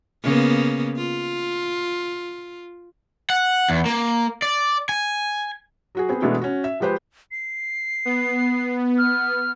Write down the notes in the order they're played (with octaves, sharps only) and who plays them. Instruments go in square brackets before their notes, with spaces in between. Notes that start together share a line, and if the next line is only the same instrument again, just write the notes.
[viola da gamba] C#3 A#3 B3
F4
[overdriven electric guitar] F#5
E2
A#3
D5
G#5
[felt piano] F#3 F#4 G#4
B3 C4 G#4
B2 E3 G#3 A3 B3 D4
C#4 F#4
E5
F3 G#3 G4 B4 C5
[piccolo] C7
[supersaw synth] B3
[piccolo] F6